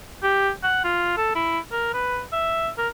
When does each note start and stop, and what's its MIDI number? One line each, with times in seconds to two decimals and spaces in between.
0.23 0.50 67
0.63 0.81 78
0.84 1.16 65
1.17 1.32 69
1.35 1.59 64
1.72 1.91 70
1.94 2.22 71
2.33 2.69 76
2.78 2.88 70